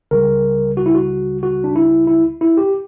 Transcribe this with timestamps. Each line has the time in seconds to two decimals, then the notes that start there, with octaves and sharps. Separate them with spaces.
0.11 C#2 C#3 G3 A#4
0.77 F#4
0.86 E4
0.94 F#4
1.43 F#4
1.64 D4
1.76 E4
2.07 E4
2.41 E4
2.57 G4